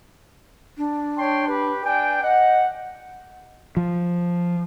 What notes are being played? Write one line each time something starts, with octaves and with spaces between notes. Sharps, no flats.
D4
C#5 G5 C6
G4 B4
D4 G5 G#5
D#5 F#5
F3